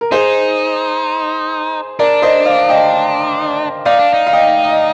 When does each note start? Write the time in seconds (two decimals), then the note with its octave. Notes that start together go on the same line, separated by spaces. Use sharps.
0.01 A#4
0.11 D#4 G#4 C5
1.99 D4 A#4 D5
2.22 C5 D#5
2.46 D5 F5
2.69 D#5 G5
3.85 D#4 D5 F5
4.00 D4
4.13 D#4
4.27 F5
4.33 D#5 G5
4.69 D#5